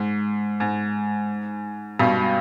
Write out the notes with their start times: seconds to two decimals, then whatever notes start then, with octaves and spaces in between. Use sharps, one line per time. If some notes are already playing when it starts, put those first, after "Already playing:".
Already playing: G#2
0.60 G#2
1.99 G2 B2